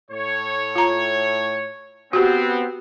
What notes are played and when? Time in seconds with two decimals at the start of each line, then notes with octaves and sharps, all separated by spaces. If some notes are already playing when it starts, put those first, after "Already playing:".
0.11 A2 C#5
0.76 F4 A#5
2.13 B3 C4 F#4 G4